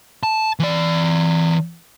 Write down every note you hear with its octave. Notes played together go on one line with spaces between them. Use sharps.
A5
E3 D5